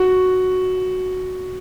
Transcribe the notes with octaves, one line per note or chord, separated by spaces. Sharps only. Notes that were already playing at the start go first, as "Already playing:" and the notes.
Already playing: F#4